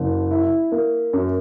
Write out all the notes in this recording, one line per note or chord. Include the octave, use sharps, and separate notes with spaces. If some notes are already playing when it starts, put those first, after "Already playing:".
Already playing: F#1
E4
A#3
F#2